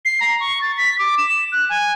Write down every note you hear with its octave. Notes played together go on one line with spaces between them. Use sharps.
C7
A#5
C#6
A6
B6
D6
E7
F#6
G#5